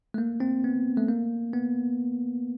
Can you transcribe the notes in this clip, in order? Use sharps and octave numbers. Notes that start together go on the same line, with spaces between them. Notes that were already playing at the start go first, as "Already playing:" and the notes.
A3
A#3
C4
B3
A3
A#3
B3